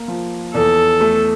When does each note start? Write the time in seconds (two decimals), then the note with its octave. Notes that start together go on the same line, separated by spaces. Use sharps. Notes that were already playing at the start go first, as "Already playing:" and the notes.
Already playing: A#3
0.08 F3
0.54 E2 A4
1.00 A3